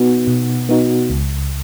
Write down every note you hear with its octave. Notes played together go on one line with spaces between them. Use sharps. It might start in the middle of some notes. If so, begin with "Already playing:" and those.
Already playing: B2 B3 D#4 F#4
B2
B3 D#4 F#4
C#2